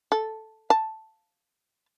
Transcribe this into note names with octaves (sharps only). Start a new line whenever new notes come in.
A4
A5